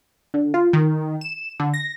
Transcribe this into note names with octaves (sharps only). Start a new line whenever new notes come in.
D3
F4
D#3
E7
D3
A#6